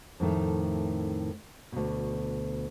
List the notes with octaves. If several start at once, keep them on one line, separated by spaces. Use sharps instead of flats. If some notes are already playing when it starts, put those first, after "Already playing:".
F2 A2 D#3 A3
D2 B2